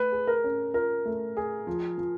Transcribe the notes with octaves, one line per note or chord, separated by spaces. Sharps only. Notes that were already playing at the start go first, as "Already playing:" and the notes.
Already playing: A3 B4
G#4
A#4
C#4
F4 A#4
A3
G#4
F3
F3